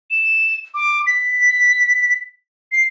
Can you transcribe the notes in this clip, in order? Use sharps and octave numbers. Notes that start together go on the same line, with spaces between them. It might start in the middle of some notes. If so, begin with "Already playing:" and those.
E7
D6
B6
C7